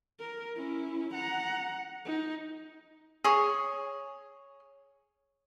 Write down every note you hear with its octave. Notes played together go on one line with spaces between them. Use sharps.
A#4
C#4 E4
F#5 A#5
D#4
G#4 C#5